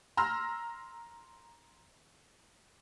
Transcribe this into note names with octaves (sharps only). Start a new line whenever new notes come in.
A#5 C6 E6 F6 A#6